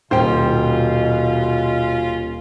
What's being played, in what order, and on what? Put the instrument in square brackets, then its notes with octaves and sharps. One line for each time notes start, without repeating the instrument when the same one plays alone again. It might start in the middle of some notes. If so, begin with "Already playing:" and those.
[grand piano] D#1 [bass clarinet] B2 [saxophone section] C#4 F4 [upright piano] C5 G5